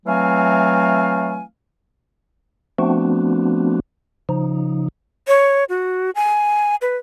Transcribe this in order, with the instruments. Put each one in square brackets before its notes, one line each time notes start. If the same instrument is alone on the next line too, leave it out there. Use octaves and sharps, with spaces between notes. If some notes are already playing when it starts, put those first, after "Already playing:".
[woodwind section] E3 F#3 A3 C4 F5 G#5
[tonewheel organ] F3 A3 B3 C4 D4 F#4
C#3 F3 D#4
[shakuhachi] C#5
F#4
G#5
B4